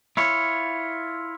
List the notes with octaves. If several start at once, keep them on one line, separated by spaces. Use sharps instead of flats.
E4 F4 C#5